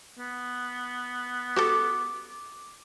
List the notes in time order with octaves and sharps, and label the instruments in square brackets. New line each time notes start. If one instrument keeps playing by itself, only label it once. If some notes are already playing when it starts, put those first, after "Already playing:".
[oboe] B3
[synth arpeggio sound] F#4 G4 A4 [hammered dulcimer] D6